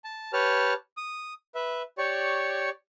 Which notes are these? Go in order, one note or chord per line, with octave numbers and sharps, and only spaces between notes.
A5
G4 B4 C#5 A5 F6
D#6
B4 E5
G4 C#5 D5 C#6